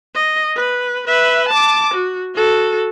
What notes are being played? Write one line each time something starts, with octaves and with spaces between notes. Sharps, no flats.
D#5
B4
B4 E5
A5 D6
F#4
F#4 A4